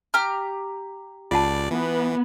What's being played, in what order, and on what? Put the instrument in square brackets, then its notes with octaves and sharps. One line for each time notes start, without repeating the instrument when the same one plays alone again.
[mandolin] G4 A#5 F6
[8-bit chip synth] C#2 D5 [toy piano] F4 F#5 A5
[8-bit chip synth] E3 [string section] B3